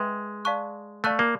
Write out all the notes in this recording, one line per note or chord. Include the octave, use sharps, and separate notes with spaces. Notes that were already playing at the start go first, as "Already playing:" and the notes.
Already playing: G#3 G#4 B4 E5 G5
D5 F5 A5 C#6 F#6
A3 D5 F5 A5 C#6 F#6
A#3